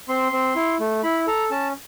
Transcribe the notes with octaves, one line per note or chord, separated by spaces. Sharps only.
C4 C6
C4
E4
A3
E4 B5
A4 A#5
C#4 A5